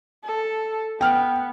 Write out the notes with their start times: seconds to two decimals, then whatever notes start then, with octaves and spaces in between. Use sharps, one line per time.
0.24 A4
1.01 B3 G5 F6